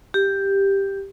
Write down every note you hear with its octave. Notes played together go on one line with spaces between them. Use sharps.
G4